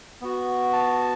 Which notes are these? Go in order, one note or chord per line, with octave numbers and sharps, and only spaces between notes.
B3 F#4
A5